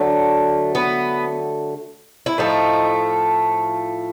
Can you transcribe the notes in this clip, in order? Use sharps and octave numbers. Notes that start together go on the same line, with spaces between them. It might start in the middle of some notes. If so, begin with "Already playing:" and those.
Already playing: D3 F#3 A3
B3
E4
A2 F3 A3 D#4